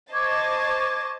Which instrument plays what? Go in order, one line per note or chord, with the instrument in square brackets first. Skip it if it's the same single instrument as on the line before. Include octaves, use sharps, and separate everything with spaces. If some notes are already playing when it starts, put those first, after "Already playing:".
[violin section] C5 D#5 A5 [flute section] C#6 D6 G#6